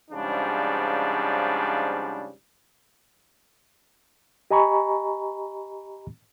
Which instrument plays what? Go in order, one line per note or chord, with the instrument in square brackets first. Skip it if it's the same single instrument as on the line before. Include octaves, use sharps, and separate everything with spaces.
[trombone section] G#2 C#3 F3 G3 D4
[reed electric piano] G4 D#5 G#5 A#5 B5 C#6